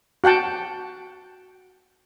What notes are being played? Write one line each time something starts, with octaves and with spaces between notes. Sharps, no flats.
F#4 F#5 G5 A5